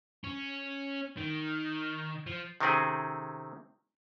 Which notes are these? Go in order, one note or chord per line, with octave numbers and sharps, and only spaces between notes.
C#4
D#3
F3
C3 D#3 A3 C4 C#4 G#4